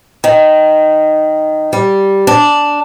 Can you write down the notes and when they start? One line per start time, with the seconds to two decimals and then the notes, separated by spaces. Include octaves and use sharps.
0.24 D#3
1.73 G3
2.27 D4